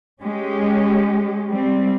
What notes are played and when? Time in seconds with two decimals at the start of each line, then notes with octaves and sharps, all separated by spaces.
0.22 G#3 C#4 G4
1.49 G3 C4